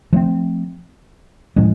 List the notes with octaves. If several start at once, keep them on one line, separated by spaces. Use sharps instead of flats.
F3 A3 C4
A2 F3 G#3 C#4